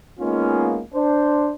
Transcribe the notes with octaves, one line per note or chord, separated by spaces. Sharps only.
G#3 A#3 B3 C#4 D#4 F4
D4 C5